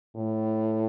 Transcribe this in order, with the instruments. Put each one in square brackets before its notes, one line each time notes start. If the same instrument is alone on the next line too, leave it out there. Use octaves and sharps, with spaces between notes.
[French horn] A2